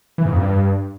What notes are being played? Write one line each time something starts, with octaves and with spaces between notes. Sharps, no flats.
E3
G#2
F2
G2